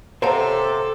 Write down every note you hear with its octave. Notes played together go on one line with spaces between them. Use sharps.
C3 A4 C5 C#5 F5 F#5 A5 A#5